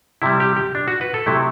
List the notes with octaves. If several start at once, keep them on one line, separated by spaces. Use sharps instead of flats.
C3 G3 E4
G4
G4
D4
F#4
B4
A4
C3 F#3 A3 E4